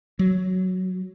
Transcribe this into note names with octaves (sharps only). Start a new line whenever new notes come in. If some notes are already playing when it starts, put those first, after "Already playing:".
F#3